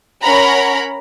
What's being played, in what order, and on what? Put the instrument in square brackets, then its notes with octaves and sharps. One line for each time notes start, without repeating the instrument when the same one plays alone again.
[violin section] C#4 A#4 F#5 A#5 B5